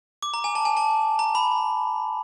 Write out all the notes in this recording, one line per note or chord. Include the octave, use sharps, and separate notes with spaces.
D6
A#5
G#5
A5
G#5
A5
A#5
B5